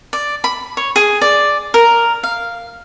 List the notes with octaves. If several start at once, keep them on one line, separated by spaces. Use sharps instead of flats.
D5
B5
C#5
G#4
D5
A#4
F5